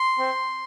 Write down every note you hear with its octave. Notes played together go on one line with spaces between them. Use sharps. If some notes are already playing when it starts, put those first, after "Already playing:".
Already playing: C6
C4